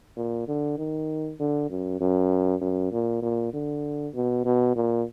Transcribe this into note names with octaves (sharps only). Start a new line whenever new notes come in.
A#2
D3
D#3
D3
F#2
F#2
F#2
A#2
A#2
D3
B2
B2
A#2